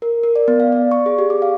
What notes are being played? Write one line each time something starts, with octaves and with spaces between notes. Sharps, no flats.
A#4
A#4
D5
B3
F5
D5
C#6
G#4
G4
D6
F5